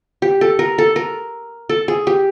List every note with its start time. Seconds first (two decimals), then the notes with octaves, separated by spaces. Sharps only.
0.22 G4
0.41 A4
0.59 A#4
0.78 A4
0.96 A#4
1.69 A4
1.88 G#4
2.07 G4